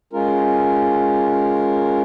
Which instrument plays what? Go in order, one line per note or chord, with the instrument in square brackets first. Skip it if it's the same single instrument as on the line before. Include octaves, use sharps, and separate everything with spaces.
[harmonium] G#3 C#4 F4 A#4